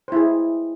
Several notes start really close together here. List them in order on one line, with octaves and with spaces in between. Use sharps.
C5 E4 G#4